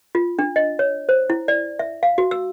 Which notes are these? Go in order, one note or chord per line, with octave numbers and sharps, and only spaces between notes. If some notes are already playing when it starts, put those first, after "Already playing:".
F4
D4
D#5
C#5
C5
E4
D5
E5
F5
F#4
E6